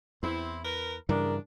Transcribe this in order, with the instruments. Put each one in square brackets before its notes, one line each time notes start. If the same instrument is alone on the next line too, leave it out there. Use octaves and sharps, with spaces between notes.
[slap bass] E2 [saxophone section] C4 E4
[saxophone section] A#4 B4
[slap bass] G2 C#3 E3 [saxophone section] G#3 B3 D4 [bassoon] A#4